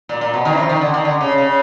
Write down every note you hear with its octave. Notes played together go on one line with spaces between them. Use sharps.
A#2
A#2
B2
D#3
E3
F3
D#3
D3
D#3
D3
C#3
C#3